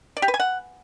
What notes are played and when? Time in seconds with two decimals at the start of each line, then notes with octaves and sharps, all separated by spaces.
0.17 D5
0.22 G4
0.28 B4
0.34 G#5
0.40 F#5